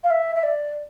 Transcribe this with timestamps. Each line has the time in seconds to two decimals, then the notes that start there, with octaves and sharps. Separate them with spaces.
0.04 F5
0.10 E5
0.35 E5
0.43 D5